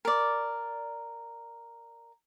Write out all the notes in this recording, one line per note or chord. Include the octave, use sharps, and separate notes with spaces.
A#4 D5